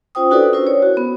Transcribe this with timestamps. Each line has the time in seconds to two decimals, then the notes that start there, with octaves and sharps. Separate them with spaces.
0.15 C#4 F4 C5 G5 D#6
0.30 D4 E4 F#4 A4 B4 D5
0.52 C#4 E4 A#4 C5
0.67 C#5
0.82 F#4
0.97 B3